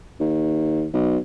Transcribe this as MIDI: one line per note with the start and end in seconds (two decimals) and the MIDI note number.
0.20 0.86 39
0.93 1.18 35